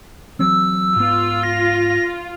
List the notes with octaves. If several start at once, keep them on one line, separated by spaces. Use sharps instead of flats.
E3 F#3 C4 E6
G#2 B3 F4
A#6